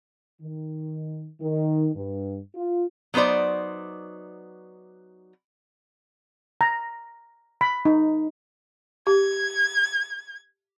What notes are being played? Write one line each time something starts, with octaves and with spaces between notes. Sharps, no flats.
D#3
D#3
G2
F4
F#3 B3 D#4 C5 D5
A#5
B5
D#4
G4 G#6